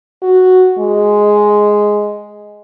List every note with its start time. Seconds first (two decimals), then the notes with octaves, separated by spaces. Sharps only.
0.23 F#4
0.79 G#3